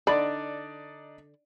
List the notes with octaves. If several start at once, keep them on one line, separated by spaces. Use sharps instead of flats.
D3 D4 D#4 D5 B5